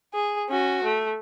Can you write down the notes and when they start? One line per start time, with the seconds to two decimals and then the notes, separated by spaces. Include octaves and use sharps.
0.14 G#4
0.49 C#4 F#4
0.84 A3